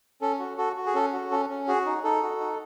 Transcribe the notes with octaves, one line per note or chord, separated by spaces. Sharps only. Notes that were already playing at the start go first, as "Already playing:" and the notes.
C#4 A4
F#4
F#4 A4
F#4
G#4
C#4 A4
F#4
C#4 A4
C#4
F#4 G#4
D#4
D#4 A4
F#4
D#4